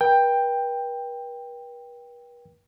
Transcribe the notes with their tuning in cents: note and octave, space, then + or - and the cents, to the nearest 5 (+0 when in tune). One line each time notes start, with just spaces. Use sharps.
B4 -45 G5 +10